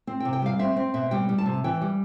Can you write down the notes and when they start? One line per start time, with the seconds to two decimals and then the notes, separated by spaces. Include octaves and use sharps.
0.07 C4
0.20 G5
0.25 C3
0.33 G5
0.42 G3 F5
0.59 C4 E5
0.76 C4
0.94 B2 E5
1.11 G3 G5
1.29 G3
1.38 A5
1.46 C3
1.64 E3 G5
1.81 G3